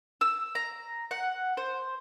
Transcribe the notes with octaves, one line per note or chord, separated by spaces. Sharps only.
E6
A#5
F#5
C5